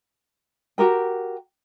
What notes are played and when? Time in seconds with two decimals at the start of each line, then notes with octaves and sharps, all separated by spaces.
0.78 F#4 G4 A#4 G5